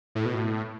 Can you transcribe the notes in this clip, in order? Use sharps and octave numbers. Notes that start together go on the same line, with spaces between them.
A2
B2
A2